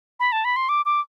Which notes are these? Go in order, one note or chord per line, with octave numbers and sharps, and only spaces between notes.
B5
A5
B5
C6
D6
D6